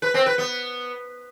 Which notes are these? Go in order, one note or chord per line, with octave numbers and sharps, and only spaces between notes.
B4
C4
B4
B3